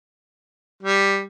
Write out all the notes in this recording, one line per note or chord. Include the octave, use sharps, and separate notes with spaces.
G3